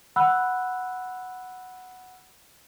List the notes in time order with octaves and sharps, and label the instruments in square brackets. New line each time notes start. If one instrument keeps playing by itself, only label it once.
[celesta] F#5 B5 E6 F#6